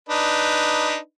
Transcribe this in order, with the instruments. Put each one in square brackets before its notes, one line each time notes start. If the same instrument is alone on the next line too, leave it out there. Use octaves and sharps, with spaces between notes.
[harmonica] D4 D#4 B4